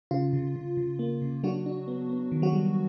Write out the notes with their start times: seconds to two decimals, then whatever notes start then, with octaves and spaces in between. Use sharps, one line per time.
0.11 C#3 F4
0.33 C#3
0.56 C#3
0.77 C#3
0.99 A#3
1.22 C#3
1.44 F#3 D4 F#4
1.66 D4
1.88 B3
2.09 B3
2.32 D#3
2.42 F#3 F#4
2.53 G3